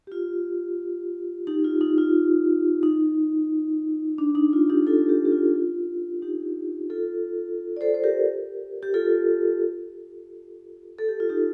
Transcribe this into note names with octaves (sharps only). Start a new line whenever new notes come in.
G4
F4
D#4 G4
F4
D#4
F4
D#4
D4
D#4
F4
D#4 G4
F4 A4
D#4 G4
G4
F4
F4
D#4 G4
F4 A4
D5
A4 C5
C5
G4 A#4
G4
F4 A4
A4
G4
F4
D#4 G4